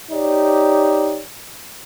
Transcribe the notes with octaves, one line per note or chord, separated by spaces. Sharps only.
D#4 G4 C#5 D5